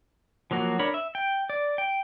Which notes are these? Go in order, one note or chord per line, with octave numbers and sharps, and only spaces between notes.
F3 F#3 A#3 F#4
D4 A#4 C#5 B5
E5
G5
D5
G5